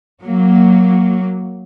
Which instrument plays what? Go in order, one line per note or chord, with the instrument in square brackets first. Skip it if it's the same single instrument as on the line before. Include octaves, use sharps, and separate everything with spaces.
[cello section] F#3 A#3